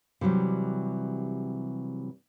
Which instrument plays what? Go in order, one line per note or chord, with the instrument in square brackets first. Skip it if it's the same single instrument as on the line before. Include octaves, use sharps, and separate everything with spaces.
[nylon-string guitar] C3 E3 F#3 G3